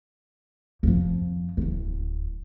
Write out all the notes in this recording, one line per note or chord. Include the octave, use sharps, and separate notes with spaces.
F2 F3
D1 D2